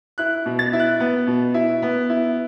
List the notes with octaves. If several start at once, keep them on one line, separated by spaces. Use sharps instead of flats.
E4 F#6
B2
A6
E4
F#6
B3
B2
E4
B3
E4